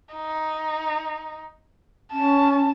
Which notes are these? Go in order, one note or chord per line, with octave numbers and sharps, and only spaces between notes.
D#4
C#4 A5